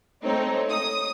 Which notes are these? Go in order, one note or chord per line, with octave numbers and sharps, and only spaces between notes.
G#3 A3 C4 D#4 C#5
D#6